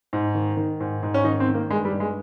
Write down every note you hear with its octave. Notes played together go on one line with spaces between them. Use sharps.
G#2
D#3
D#3
G#2
G#2
C#4
D#3 D#4
C4
D#3
A#3
G2 G#3
G3
G2
G#3